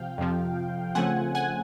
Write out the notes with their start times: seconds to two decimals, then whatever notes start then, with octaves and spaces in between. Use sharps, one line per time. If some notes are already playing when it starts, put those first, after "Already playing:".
Already playing: C3 F3 F5 G5
0.18 F2 C3 F3
0.95 C#3 F3 A3 C4 F#5 G#5
1.35 F#5 G#5